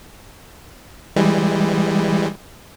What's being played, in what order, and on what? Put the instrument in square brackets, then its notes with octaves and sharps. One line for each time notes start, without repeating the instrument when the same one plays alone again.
[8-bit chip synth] E3 G3 G#3